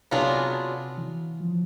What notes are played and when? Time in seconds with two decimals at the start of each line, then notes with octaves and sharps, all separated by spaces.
0.11 C3 F#3 B3 D4 F4 G#4
0.98 E3
1.41 F3